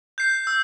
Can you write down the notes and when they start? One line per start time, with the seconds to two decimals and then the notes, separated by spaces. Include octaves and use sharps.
0.18 G6 C7
0.47 E6